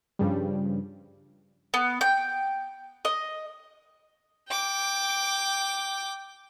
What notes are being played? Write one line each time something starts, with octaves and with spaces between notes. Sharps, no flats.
G2 C#3 F3 G3
B3
G5
D#5
G5 D6